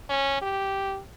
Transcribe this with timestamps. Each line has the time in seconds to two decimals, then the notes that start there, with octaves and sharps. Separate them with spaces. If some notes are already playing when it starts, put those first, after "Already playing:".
0.09 C#4
0.42 G4